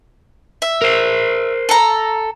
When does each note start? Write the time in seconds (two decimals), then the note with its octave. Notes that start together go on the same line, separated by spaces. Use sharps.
0.62 E5
0.82 A#4 C5
1.69 A4 A#5